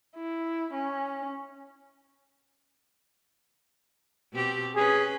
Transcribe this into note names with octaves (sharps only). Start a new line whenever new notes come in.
E4
C#4
B2 C4 G4
C#4 G#4 B4